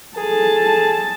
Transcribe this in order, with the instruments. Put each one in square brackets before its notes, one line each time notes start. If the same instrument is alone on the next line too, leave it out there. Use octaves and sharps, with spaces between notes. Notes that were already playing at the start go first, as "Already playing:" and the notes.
[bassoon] G#4 [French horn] A4 [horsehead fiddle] A5